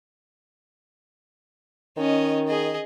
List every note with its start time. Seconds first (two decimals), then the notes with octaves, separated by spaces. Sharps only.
1.97 D#3 C#4 D#5
2.48 G#4 D#5